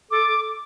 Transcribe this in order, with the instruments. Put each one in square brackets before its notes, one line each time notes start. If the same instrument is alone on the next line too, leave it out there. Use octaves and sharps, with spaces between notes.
[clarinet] A4 [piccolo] D6